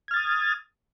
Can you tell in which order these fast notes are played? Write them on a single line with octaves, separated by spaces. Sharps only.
G#6 F6 A6 D#6